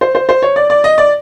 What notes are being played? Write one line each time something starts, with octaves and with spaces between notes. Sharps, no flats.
C5
C5
C5
C#5
D5
D5
D#5
D5